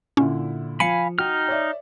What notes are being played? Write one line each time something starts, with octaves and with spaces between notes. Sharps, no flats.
A#2 D3 C#4 E4
F3 F5 G#5 B5 C#7
D#4 F#4 G5 F6
C#5 D5 E5